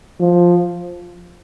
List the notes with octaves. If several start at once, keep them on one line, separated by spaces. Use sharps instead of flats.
F3